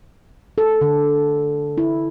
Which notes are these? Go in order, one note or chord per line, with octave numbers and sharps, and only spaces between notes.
A4
D3
E4